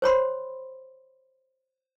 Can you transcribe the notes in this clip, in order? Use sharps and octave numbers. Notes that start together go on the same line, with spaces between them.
C5 C#5 B5 C6